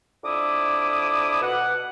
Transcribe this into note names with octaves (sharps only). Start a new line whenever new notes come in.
F2 D4 E4 D6 D#6
B2 F#5